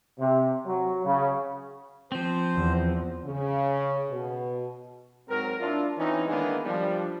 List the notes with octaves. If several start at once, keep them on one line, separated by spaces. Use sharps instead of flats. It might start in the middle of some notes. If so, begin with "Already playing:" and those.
C3
F#3
C#3
F3 C4 C5
E2
C#3
B2
G#2 F#3 C4 A#4
D4 E4 F4
E3 C4 C#4 D#4
D#3 E3 G#3 A#3 B3 D4
F3 G3 D4